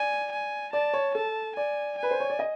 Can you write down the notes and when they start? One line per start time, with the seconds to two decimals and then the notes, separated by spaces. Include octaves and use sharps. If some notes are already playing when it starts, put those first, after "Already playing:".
Already playing: D5 G#5
0.32 G#5
0.73 D5 A5
0.93 C#5
1.15 A4 A5
1.56 D5 G#5
1.98 B4 G#5
2.11 C5
2.20 C#5
2.30 D5
2.39 D#5